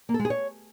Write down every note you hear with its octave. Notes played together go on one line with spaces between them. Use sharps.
A#3
A4
G#3
G#4
C#5